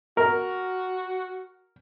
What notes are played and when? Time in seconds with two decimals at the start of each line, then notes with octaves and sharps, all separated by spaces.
0.17 F#4 A#4